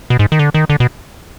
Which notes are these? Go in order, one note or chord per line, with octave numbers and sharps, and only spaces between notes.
B2
G#2
D#3
D3
D#3
D3
B2